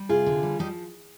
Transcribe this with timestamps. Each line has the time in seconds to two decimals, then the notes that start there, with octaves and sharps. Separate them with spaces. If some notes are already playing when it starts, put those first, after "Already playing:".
Already playing: G3
0.09 C3 F4 G#4
0.26 D3
0.43 G3
0.59 F3 D#4 G4